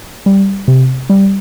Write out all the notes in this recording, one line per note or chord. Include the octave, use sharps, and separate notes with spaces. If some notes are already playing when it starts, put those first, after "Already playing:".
G3
C3
G3